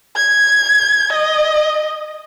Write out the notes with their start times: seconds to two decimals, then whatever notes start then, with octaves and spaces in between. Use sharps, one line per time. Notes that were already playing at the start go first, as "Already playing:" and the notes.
0.16 G#6
1.12 D#5